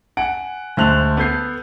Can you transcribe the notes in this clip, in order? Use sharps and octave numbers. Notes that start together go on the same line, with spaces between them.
F#5 G#5 D7
D2 G#3 C5 A5 F#6 F7
B3 A4 G6 C7